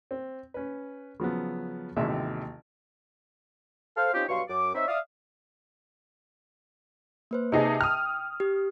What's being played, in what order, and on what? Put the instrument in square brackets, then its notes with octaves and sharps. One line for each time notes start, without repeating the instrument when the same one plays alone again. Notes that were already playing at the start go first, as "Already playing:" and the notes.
[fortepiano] C4
C#4 B4
C#3 F3 F#3 B3
A1 D#2 C3 G#3 F#4 E5
[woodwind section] A4 C5 F5
C4 C#4 D#4 F4 G4
G2 B2 F#3 F5 C6 C#6
F#2 D6
C4 D#4 C#5 D#5 E5
D5 E5 F5 D#6
[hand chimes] A#3 B4 C5
[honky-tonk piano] C3 D#4 G#4 [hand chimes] D#5 A5
[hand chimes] G5 [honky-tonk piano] D#6 F6
[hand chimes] G4